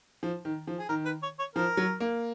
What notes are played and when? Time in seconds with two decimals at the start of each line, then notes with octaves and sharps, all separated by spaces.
0.23 F3
0.45 D#3
0.67 F3
0.79 G#4
0.89 D#3 A#4
1.05 B4
1.23 C#5
1.39 C#5
1.55 F3 A#4
1.77 F#3
2.00 A#3